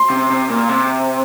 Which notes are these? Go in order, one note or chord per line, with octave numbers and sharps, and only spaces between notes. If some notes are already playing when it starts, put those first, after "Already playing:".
Already playing: C6
C3
C3
A#2
C3